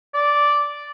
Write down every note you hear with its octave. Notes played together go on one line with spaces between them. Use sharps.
D5